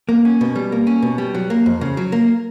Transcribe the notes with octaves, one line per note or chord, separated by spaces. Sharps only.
A#3
C#4
B2
G3
A#3
C#4
B2
G3
F#3
A#3
F2
C#3
F#3
A#3